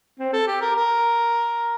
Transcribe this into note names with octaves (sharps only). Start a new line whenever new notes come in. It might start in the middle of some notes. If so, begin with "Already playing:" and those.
C4
A4
G4
A#4
A#4